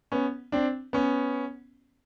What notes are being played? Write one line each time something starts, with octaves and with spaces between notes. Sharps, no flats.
B3 C#4
C4 D4
B3 C#4